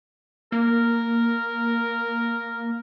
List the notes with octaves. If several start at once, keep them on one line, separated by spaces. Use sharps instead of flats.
A#3 A#4